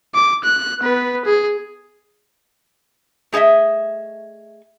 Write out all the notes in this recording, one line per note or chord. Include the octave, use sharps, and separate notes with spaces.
D6
F#6
B3 B4
G#4
A3 G#4 C5 D#5 E5